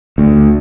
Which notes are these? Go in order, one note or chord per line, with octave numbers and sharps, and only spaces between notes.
D2